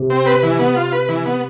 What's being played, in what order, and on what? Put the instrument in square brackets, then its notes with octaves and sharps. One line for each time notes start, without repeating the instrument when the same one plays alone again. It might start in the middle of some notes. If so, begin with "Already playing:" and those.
Already playing: [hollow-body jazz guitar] C3
[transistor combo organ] C4
B4
E3
B3
F4
B4
E3
B3